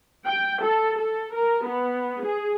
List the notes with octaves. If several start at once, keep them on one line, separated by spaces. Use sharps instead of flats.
G5
A4
A4
A#4
B3
G#4